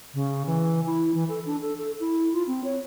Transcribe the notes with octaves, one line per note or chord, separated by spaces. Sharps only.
C#3
E3
E4
E3
A4
D4
A4
A4
E4
F4
C4
C#5